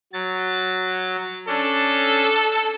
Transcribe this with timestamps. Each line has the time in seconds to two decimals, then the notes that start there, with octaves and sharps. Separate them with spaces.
0.13 F#3 A6
1.48 C#4 D4 A4